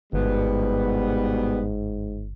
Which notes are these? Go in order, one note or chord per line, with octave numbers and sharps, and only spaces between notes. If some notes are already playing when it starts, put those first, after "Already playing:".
G1 G#2 B2 G3 B3